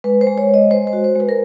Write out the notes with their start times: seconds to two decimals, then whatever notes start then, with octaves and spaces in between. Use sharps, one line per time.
0.04 G#3 B4
0.21 C5
0.27 G#3
0.38 C#5
0.49 G#3 D#5
0.71 G#3 C5
0.87 C5
0.93 F#4
1.04 C5
1.15 G#3 B4
1.29 A#4